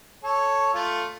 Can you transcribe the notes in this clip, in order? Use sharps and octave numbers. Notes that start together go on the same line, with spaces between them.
A4 C#5
A3 F4